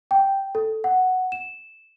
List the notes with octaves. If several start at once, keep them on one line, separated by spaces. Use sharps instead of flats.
G5
A4
F#5
E7